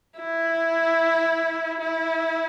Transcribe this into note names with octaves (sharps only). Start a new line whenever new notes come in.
E4
E4